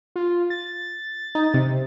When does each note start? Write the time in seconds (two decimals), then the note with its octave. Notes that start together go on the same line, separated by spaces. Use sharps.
0.16 F4
0.50 A6
1.35 D#4
1.54 C3